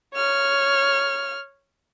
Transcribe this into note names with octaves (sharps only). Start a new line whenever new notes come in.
C#5 F6